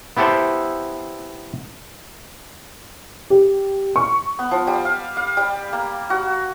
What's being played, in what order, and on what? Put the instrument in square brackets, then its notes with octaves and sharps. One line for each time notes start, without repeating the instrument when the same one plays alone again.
[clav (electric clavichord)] B3 E4 G4 A4 C5
[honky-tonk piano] G4
C#6
[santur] B3
F3
G3
F5
F5
G3
A#3
F#4